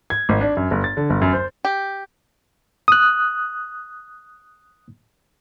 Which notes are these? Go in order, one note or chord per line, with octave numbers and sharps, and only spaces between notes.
G#6
G#1
D4
F#2
G1
A6
D3
G1
F#2
C5
G4
D#6 F#6